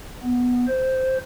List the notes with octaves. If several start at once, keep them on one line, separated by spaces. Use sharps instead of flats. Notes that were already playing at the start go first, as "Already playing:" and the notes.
B3
C5